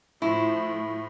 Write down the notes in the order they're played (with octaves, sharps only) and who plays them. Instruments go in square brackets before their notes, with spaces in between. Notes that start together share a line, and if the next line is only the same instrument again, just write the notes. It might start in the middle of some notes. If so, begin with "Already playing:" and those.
[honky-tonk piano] A2 [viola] F3 A3 [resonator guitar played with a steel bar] E4